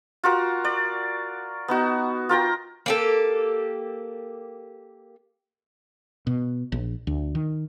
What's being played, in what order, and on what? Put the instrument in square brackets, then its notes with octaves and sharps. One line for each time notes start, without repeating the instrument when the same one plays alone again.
[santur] F4 F#4 A#4
D5
B3 D#4 F#4
F4 A#4 G5 A#5
[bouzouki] A#3 G4 A4
[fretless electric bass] B2
A#1
D2
D#3